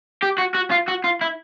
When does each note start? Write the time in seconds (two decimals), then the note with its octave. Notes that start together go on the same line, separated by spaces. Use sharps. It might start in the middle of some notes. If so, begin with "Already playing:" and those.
0.23 G4
0.38 F#4
0.54 F#4
0.71 F4
0.88 F#4
1.04 F4
1.21 E4